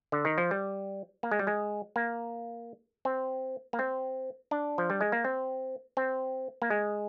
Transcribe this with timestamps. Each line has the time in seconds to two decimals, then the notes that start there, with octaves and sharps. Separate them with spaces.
0.12 D3
0.25 D#3
0.38 F3
0.51 G3
1.23 A#3
1.31 G#3
1.39 G3
1.47 G#3
1.96 A#3
3.05 C4
3.73 A#3
3.79 C4
4.51 D4
4.78 F3
4.90 G3
5.01 G#3
5.12 A#3
5.24 C4
5.97 C4
6.62 A#3
6.70 G#3